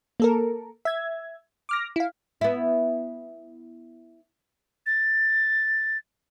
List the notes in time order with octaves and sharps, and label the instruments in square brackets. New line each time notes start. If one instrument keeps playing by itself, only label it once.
[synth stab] A#3 A4 A#4
E5 G#6
D6 F6 A#6
E4 F5
[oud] B3 E4
[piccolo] A6